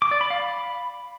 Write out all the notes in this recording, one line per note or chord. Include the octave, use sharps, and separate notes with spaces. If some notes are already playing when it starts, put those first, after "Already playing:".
D6
D5
B5
F5
B5